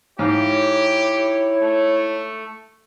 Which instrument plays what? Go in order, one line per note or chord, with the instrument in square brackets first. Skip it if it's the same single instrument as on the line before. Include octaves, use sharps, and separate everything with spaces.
[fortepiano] G#2 F5 [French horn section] E4 C#5 [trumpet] G4
[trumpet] A3